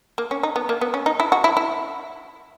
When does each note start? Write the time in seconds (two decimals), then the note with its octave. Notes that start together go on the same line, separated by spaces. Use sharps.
0.18 A#3
0.31 C#4
0.43 D#4
0.56 B3
0.69 A#3
0.81 B3
0.94 C#4
1.06 D#4
1.20 E4
1.32 F#4
1.44 E4
1.57 E4